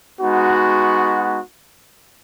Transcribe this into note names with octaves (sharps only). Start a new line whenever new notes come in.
G#3 B3 D#4 F#4